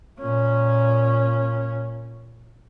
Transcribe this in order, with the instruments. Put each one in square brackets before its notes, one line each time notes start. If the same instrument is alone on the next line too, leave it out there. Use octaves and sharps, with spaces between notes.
[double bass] A#2 C#4